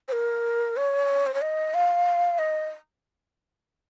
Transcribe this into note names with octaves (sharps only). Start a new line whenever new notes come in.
C5
A#4
C#5
C5
C#5
D#5
F5
D#5